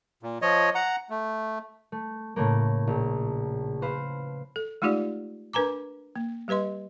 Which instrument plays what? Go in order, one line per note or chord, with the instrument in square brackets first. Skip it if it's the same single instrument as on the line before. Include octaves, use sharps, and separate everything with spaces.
[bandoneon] A#2
F3 C#5 D#5
F#5 A#5
A3
[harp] A3
A2 C#3 A3 A#3
A#1
B4 C5 F5
[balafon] A4
G#3 A3 D#4 F4 G4 D5
D4 A#4 B4 G#5 A#5 D6
A#3
G3 G4 B4 D#5 C6